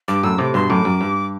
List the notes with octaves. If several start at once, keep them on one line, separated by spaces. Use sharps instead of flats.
G2 D6
F#2 A2 E6
A2 C3 D6
G2 B2 C6
F#2 A2 D6
F#2
G2